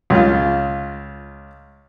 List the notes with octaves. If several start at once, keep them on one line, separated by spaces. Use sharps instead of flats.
C#2 F4